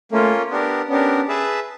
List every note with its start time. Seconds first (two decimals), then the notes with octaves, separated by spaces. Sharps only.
0.12 A3 A#3 C#4 F4
0.50 B3 D4 G4 A#4
0.89 B3 C#4 D4 G4 A#4
1.28 G#4 B4 E5 A5